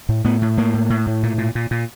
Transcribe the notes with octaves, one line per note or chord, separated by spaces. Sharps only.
A2
A2 B3
A2
A2 A#3
A2
A2
A2
A#2
A#2
A#2
A#2